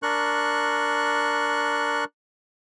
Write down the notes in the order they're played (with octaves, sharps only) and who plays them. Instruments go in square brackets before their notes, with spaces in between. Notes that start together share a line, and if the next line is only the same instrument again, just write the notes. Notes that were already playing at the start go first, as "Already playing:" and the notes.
[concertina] D4 A#4 C#6 F#6